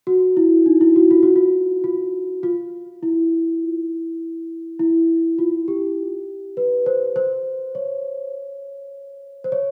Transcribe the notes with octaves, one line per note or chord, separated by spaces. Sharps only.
F#4
E4
D#4
E4
F#4
F4
F#4
F4
F4
F4
E4
E4
F4
G4
B4
C5
C5
C#5
C5
C#5